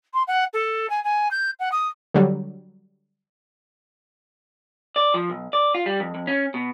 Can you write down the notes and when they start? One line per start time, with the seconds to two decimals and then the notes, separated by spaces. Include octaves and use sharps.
0.14 C6
0.27 F#5
0.53 A4
0.90 G#5
1.04 G#5
1.31 G6
1.59 F#5
1.72 D#6
2.14 D3 F#3 G3
4.96 D5
5.14 F3
5.30 B1
5.53 D5
5.75 F4
5.86 G3
6.00 F2
6.15 F2
6.27 C#4
6.54 B2